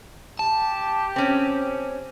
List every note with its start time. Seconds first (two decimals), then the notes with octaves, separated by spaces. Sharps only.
0.39 G4 A5
1.16 C4 C#4